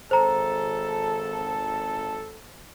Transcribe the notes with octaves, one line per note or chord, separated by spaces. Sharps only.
G#1 A4 C5 A#5